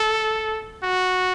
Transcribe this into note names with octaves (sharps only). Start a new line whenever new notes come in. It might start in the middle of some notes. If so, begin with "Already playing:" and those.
Already playing: A4
F#4